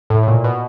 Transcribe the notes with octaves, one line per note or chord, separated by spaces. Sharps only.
A2
A2
A#2
B2